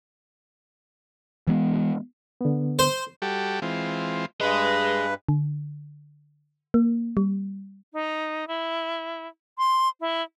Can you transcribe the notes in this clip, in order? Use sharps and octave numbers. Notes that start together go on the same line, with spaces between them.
E3 G#3 B3
D3 B3
C5
G3 F#4 G4 A4
E3 G#3 C4 F4
G2 G#4 B4 D#5
D3
A#3
G3
D#4
E4
C6
E4